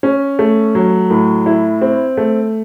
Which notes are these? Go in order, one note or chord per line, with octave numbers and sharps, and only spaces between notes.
C#4
A3
F#3
A2
E4
C4
A3